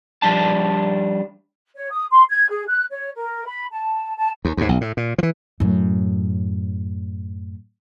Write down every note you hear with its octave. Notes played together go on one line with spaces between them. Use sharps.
F3 G3 D4 A5
C#5
D#6
C6
G#6
G#4
F#6
C#5
A#4
B5
A5
A5
D#2
D#2 G#2
B1
A2
A#2
E3 F3
F#2 A2